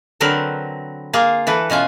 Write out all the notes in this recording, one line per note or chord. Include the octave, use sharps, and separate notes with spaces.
D3 F#3 C4 A#4 B4
A#3 F4 G#4
E3 A4 B4
B2 C#4 F4 G#5